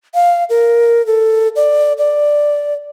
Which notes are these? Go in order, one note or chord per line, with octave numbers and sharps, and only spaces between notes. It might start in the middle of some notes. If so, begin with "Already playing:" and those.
F5
A#4
A4
D5
D5